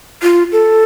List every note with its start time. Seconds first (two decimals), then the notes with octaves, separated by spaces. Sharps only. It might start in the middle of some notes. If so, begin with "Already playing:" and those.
0.22 F4
0.52 A4